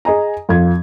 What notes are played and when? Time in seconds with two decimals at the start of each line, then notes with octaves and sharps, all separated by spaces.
0.05 G#4 D#5 G#5 A#5
0.49 F2 F3 G#6